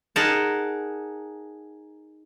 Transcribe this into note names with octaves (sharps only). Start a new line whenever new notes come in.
D#4 G#4 A#4 F#5 A5